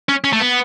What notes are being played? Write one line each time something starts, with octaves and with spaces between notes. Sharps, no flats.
C#4
C#4
A3
B3